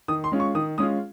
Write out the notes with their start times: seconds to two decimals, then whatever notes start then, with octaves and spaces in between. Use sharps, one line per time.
0.08 D#3 D#6
0.24 C6
0.32 G#3 C#4 F4
0.40 C#6
0.55 D#3 D#6
0.78 G#3 C#4 F4 D#6